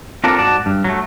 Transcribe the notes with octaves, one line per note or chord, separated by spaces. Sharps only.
C4 D4 F4 A4 A#4
G#2 F#4 D5 A5
G2
F#3 A3